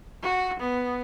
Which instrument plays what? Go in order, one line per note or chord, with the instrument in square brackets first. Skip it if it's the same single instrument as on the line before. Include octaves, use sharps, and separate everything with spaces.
[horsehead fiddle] F#4
B3